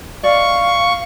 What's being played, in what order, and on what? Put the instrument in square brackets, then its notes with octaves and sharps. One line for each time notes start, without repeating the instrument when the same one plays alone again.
[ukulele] D5 D#5 [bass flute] F5 [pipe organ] C#6